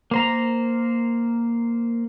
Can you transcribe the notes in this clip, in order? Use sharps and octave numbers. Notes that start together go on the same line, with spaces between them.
A#3 C5 A#5